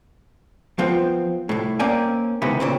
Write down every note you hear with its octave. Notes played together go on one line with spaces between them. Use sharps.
F3 B3 C4
C2 A2
A#3 C4 C#4 D5 G#5
C#2 C3 D#3 E3 B3
A#2 C#3 C4